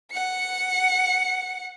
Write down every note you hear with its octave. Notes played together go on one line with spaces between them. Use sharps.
F#5 C#7